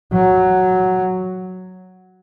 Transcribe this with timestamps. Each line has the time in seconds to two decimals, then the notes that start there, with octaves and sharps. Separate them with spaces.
0.13 F#3